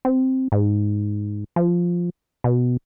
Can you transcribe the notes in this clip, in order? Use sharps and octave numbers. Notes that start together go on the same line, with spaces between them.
C4
G#2
F3
B2